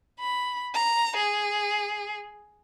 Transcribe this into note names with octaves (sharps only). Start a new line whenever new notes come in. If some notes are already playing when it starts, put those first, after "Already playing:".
B5
A#5
G#4